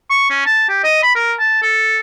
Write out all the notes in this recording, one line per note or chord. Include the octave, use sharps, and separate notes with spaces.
C#6
C#4
A5
G4
D#5
B5
A#4
A5
A4